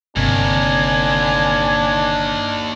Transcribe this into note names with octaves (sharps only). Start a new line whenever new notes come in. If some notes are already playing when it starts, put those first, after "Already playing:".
G1 D#2 C3 C4 D4 G#5